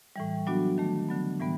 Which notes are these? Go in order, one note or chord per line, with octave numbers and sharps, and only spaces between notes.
A2 E3 G3
F#3 B3 D4 F#4
D#3 F#3 A3
D3 F#3 B3
A2 E3 G3 B3